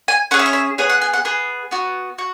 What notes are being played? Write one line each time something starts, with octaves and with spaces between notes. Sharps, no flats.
G#5
C#4 G#4 F#5
E5
C#5
E5
B3 G#4 C#5
F#5
G#5
F#5
B3 G#4
B3 F#4
F#4